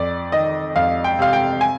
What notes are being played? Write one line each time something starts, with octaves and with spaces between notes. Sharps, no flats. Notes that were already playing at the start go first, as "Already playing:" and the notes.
Already playing: F2 D5
D#3 D#5
F2 F5
G5
C3 F5
G5
G#5